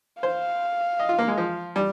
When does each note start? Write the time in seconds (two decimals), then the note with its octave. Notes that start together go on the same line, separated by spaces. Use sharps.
0.23 C5 F5
1.00 D#5
1.09 F4
1.19 A#3
1.28 G#3
1.38 F3
1.76 G3